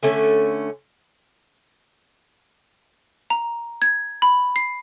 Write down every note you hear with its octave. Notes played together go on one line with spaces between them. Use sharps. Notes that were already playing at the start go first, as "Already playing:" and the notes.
D3 A3 C#4
A#5
G#6
B5
C7